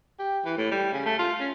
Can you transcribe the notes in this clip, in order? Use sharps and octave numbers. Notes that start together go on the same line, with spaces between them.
G4
E3
A2
G3
C#3
A3
F4
C#4